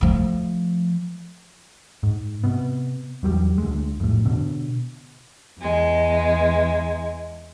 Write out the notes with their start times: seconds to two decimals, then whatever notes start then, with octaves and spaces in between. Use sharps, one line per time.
0.01 F3 A3
2.03 G#2
2.44 C3 B3
3.23 E2 F#3 G3
3.58 D2 G#3
4.00 F2 A2
4.25 B2 D3
5.59 E2 G#3